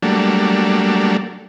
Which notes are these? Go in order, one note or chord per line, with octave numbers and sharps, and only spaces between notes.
F#3 G3 A3 A#3 D4